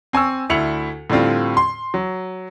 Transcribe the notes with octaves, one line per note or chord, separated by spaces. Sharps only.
C4 G#5 C#6 E6
D2 E4 C#7 F7 F#7
A2 D3 G3 C4 F4
C6
F#3